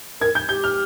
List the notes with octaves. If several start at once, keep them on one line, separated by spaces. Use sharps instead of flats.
A#4 G#6
G6
G4 G6
F6